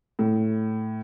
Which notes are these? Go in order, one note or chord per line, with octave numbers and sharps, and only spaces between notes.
A2